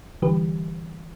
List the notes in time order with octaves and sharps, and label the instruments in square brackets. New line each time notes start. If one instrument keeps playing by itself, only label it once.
[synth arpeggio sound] D3 E3 G3 G4 B4